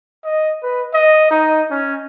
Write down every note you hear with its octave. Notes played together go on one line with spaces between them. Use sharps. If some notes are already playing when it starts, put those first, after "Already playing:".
D#5
B4
D#5
D#4
C#4